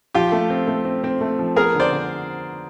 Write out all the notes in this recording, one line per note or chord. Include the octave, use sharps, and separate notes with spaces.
F3 F4 G4
A3
C4
A3
C4
C4
A3
F3
B3 G#4 A#4
D3
C5 D5
D3